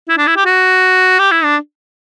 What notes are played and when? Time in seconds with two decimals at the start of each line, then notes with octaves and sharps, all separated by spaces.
0.09 E4
0.18 D4
0.27 E4
0.37 G4
0.46 F#4
1.19 G4
1.32 E4
1.44 D4